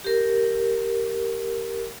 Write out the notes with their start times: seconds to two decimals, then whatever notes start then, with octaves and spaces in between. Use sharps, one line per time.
0.05 G4 A#4